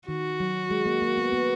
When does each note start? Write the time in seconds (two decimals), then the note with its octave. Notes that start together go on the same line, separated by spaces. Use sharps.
0.08 D#3 F#4
0.40 F#3
0.71 G#3
0.86 A#3
1.02 A#3
1.17 B3
1.32 B3